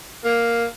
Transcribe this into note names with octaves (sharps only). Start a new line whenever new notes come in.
A#3